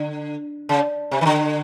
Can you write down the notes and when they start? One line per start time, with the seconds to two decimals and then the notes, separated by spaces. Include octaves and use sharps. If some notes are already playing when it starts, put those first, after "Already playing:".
Already playing: D3
0.69 C#3
1.11 C3
1.21 D#3
1.25 D3